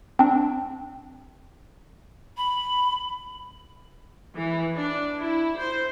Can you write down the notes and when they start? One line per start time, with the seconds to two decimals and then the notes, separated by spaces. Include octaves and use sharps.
0.19 C4 D4
2.37 B5
4.35 E3
4.76 D4
5.18 E4
5.59 C5